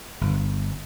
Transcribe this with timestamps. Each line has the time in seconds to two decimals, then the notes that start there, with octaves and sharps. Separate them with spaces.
0.21 G1